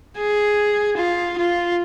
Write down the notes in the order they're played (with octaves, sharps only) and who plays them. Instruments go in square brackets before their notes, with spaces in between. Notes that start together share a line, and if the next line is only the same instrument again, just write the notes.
[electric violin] G#4
F4
F4